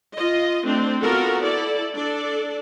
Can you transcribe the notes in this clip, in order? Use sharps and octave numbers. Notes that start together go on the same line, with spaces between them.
F4 D#5
A3 C4 D4
B3 F4 F#4 A4 A#4
E4 A4 D5
D4 A4 D5